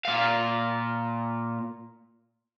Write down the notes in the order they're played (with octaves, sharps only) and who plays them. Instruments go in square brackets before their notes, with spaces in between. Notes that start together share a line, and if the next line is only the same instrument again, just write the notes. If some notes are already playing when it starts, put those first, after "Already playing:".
[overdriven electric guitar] A#2 F5